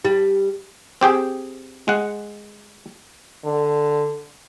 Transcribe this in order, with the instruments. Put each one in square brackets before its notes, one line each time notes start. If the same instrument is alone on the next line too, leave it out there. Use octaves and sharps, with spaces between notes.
[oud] G3
[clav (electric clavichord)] C4 G4 G#4 G5
G#3 F#5
[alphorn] D3